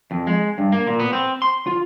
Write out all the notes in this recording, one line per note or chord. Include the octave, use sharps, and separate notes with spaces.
F2
G#3
G2
A#3
A#2
B3
C4
C6
F4